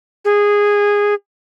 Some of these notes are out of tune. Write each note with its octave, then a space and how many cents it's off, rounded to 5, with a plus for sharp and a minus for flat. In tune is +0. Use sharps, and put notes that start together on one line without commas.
G#4 -15